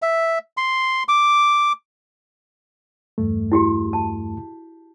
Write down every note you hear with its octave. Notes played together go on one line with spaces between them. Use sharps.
E5
C6
D6
E2 G2 A3
E4 F#4 G4
A5